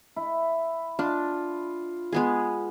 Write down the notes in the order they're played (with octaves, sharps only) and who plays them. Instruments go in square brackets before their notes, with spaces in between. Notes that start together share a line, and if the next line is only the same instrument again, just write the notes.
[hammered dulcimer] E4
[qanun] D4 [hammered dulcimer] F4
[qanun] G#3 B3 G#4